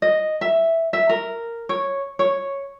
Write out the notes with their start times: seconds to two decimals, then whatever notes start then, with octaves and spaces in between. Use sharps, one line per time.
0.02 D#5
0.41 E5
0.93 E5
1.09 A#4
1.69 C#5
2.19 C#5